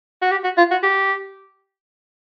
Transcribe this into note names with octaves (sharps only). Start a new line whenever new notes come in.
F#4
G4
F#4
F4
F#4
G4